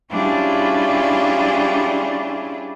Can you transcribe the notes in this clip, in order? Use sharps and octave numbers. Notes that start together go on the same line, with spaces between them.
G3 C#4 D4 E4 F4 G#4